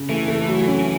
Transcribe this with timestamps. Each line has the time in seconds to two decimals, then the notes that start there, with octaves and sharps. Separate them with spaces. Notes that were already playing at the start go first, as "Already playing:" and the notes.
Already playing: C#3
0.09 E3 A3
0.28 A3
0.48 F#3
0.68 C#4